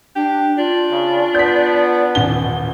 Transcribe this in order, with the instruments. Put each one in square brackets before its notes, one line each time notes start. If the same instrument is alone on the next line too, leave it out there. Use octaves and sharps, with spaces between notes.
[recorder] D4 [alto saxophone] G4
[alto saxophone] D4 [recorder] F4
[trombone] C#3
[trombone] B3 [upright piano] G6 B6
[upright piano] D#1 A1 G7